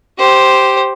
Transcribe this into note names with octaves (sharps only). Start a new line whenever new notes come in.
G4 C5